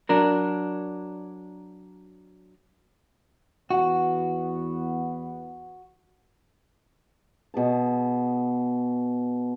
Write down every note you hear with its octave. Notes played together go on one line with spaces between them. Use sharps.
F#3 D4 A#4
E2 B3 F#4
B2 G#4 A5